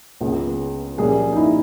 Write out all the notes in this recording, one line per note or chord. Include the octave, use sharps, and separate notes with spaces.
C#2 C#3 G#3 B3
A#1 A#2 G3 A#3 C#4 G#4
D#4
E4